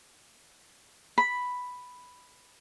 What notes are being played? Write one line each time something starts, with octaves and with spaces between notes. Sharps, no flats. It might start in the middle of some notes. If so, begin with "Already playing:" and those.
B5